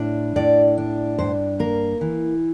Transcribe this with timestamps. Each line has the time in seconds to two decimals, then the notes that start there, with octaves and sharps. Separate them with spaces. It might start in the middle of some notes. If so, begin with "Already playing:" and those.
Already playing: A2 D4
0.36 A2 D5
0.78 D4
1.19 G2 C5
1.59 A#3 A#4
2.01 E3